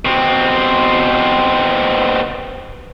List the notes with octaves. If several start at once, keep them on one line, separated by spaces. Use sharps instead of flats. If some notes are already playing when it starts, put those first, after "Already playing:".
B2 C4